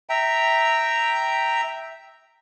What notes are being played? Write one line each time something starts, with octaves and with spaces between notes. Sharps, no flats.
E5 G5 A#5